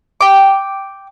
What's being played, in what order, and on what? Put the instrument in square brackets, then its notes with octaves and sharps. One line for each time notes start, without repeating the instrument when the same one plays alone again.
[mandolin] G5 D6